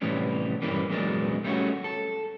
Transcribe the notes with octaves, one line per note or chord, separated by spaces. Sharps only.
A2 C3 E3 G3 C#4
G2 A#2 E3 G3 A#3 C#4
E2 A#2 F#3 G#3 A#3 D4
G3 A3 C#4 F4 F#4
A4